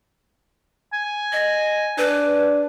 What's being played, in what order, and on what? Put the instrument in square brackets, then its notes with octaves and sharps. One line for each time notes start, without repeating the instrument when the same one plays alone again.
[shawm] G#5
[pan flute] D#5
[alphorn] D4 [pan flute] B4